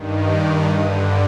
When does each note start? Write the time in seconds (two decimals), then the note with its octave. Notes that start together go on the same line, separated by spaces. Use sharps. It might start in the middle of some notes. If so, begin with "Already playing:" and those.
Already playing: G2 D#3
0.29 D6
0.70 G2 D3 D#6